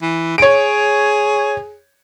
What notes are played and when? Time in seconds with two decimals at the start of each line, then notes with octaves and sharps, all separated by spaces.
0.02 E3
0.38 G#4 C#5 D7